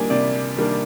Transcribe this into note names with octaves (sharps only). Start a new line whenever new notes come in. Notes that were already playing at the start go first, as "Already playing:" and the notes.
Already playing: D#3 G3 A#3 D4 G#5
C3 D5
D#3 G3 A#3 D4